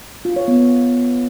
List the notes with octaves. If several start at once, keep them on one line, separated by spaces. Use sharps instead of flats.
F4
C#5
B3